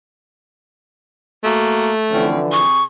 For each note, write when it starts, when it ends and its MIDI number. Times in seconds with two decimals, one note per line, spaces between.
1.44 2.34 57
1.44 1.90 58
1.44 1.90 66
2.11 2.62 50
2.11 2.62 52
2.11 2.62 53
2.11 2.39 60
2.11 2.39 61
2.52 2.82 48
2.52 2.82 68
2.52 2.83 85